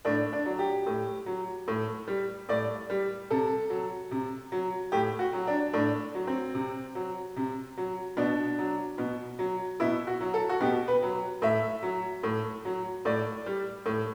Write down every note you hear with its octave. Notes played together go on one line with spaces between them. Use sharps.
A2 D4
D4
F#3
G4
A2
F#3
A2
G3
A2 D5
G3
C3 A4
F#3
C3
F#3
A2 G4
F#4
F#3
D4
A2 D4
F#3
C4
C3
F#3
C3
F#3
B2 D4
F#3
B2
F#3
B2 E4
F#4
F#3
A4
F#4
B2 G4
B4
F#3
A2 E5
F#3
A2
F#3
A2 D5
G3
A2